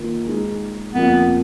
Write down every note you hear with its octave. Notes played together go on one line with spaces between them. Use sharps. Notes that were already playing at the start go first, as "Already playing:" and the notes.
Already playing: D#3 A#3 F4 A#4
G#3 D#4 G#4
F2 F3 A#3 B3 F4 A#4